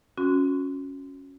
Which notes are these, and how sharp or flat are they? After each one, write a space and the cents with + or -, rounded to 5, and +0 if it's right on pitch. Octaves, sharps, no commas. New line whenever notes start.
C#4 +0 F#4 -25 C6 -25